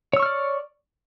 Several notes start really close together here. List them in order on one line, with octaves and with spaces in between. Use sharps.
C#5 E6 C#6 F6 D5